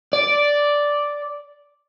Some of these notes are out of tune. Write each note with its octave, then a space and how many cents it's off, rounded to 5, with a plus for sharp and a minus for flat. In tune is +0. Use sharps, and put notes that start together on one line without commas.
D5 -5